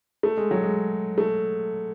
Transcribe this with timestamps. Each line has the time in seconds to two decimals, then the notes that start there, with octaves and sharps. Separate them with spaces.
0.23 A3
0.37 G#3
0.51 F#3
0.63 G#3
1.18 A3